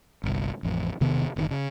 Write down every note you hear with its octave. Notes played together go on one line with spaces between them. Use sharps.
G1 C2
A1 F2
E1 C3 D#3 B3
F#1 B2 D#3
C#3